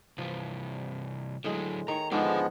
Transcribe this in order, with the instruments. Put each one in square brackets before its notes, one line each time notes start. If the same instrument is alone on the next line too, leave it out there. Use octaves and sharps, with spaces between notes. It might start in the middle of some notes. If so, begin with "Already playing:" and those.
[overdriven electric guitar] C2 E3 [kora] F3
[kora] A2 G#3 [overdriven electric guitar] D3 F#3
[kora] D#3 C#5 [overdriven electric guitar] A#5
[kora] G#2 [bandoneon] F3 G#3 B3 [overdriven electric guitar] D4 A4